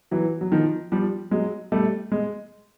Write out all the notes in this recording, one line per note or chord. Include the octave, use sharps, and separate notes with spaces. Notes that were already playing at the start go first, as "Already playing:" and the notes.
E3 F#3
F#3
D#3 F3
F3 G3
F#3 G#3
G3 A3
G#3